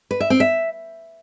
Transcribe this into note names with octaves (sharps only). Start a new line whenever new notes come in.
B4
E5
C4
E5